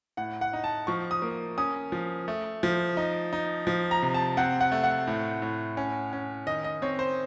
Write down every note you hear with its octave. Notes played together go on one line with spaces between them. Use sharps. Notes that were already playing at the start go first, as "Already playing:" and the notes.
A2 F#5
F#5
D#4
A5
F3 C#6
D#6
A#3
C#4 D#6
F3
A3
F3
D#4
D#4
F3
A#5
C3
A5
C4 F#5
F#5
A3
F#5
A2
A2
C#4
C#4
D#3 D#5
D#5
C4 C#5
C5